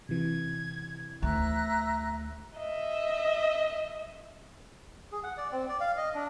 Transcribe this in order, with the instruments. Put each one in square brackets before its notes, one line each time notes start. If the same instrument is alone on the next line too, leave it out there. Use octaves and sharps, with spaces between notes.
[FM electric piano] C3 E3 [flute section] G#6
[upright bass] D2 [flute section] E5 A#5 F#6
[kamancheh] D#5 E5
[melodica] G#4
F#5
D5
C4
D5
F5
D#5
D4